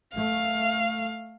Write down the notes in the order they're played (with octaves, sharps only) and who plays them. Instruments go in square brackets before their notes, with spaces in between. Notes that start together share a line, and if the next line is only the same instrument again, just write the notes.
[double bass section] A3 [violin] F5